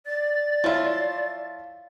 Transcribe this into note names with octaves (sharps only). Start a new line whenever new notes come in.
D5 A6
F3 E4 F4 C#5 E5